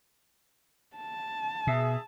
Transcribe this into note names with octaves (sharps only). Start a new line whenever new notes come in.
A5
B2 G#4 E5